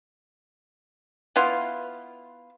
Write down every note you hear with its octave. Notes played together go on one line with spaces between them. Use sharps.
B3 E4 F4